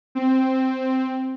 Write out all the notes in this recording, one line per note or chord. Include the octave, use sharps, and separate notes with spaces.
C4